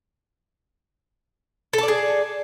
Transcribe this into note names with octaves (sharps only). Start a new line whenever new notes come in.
G#4 A4 D5 A5